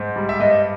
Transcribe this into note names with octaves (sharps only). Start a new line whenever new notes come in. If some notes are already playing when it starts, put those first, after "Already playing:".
Already playing: G#2
G3
E5
G2 D#5